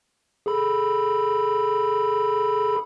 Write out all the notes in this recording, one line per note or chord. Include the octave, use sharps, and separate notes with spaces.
G#4 A4 B5